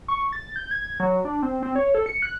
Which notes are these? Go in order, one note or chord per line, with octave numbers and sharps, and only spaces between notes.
C#6
A6
G6
G#6
F#3
D4
C4
C4
C#5
A4
C#7
F#6